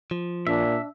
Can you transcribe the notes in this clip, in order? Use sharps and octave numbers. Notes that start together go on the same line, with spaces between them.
F3
A#2 D4 E5